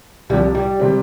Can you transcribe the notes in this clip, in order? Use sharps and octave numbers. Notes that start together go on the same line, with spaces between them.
C2 C3 F3 G3
G3
C3 G3 C4